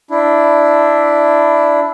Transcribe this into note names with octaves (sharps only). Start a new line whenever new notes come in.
D4 E4